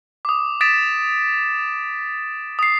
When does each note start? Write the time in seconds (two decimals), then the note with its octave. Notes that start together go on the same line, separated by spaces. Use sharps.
0.25 D6 D#6
0.61 D#6 A6 B6 D7 E7
2.59 D#6 C7